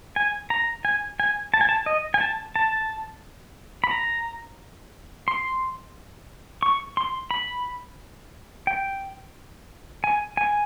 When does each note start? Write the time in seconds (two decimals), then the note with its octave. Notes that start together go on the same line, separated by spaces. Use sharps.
0.16 G#5
0.50 A#5
0.85 G#5
1.20 G#5
1.54 A5
1.61 G#5
1.69 A5
1.86 D#5
2.14 G#5
2.21 A5
2.56 A5
3.84 B5
3.91 A#5
5.28 C6
6.63 C#6
6.97 C6
7.31 B5
8.67 G5
10.04 G#5
10.37 G#5